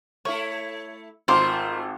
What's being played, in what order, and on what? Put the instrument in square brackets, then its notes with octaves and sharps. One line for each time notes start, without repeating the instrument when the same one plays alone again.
[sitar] A3 E4 [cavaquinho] C#5
[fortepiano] G#1 C6 D6 [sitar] A3 F4 [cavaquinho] A#4 C5